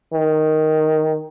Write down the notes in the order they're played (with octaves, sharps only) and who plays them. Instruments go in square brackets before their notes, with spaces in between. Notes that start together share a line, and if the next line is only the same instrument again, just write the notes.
[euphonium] D#3